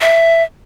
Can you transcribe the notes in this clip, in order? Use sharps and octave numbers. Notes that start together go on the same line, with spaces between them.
E5